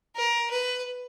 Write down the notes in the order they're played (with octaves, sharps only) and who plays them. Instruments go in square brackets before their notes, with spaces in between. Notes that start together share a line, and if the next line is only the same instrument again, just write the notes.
[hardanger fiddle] A#4
B4